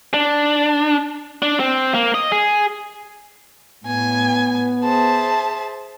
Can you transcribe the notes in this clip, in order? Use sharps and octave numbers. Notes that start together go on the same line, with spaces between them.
D4
D4
C4
A#3
D#5
G#4
A2 B3 G#5
G#4 C5 E5 A5